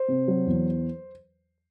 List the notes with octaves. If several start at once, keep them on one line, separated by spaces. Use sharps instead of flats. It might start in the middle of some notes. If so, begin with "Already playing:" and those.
Already playing: C5
C3
F#3
E2